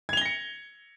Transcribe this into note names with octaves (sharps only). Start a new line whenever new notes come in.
G#6 A#6 C#7 F7 G7